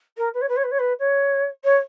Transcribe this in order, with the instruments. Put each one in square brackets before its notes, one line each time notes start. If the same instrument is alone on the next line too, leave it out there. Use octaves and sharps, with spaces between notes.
[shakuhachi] A#4
B4
C#5
B4
C#5
B4
C#5
B4
C#5
C#5